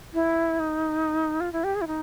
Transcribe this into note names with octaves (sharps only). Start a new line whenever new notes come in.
E4
D#4
F4
E4
G4
G#4
E4
D#4